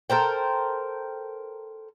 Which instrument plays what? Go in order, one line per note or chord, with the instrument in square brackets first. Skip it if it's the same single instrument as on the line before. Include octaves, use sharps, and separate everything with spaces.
[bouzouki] A4 A#4 C5 G5